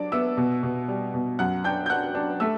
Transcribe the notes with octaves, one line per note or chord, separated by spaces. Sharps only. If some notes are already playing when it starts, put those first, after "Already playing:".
Already playing: F#3 D4 D5 D6
B3 E5 E6
B2
B2
G3
B2
F#2 F#5 F#6
D4 G5 G6
G6
D4 F#5 F#6
D4
A3 E5 E6